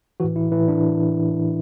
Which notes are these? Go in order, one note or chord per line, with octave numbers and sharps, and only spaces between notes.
A2 E3 F#4
E4
A2 E3 E4
D4